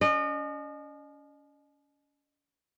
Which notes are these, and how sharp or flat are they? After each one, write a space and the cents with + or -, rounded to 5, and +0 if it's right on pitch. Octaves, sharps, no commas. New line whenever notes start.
C#4 +40 D#5 -35